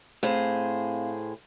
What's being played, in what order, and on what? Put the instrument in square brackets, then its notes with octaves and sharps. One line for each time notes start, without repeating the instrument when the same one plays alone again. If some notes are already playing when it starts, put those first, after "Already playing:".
[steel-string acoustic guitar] A2 G#4 C5 [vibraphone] C4 F5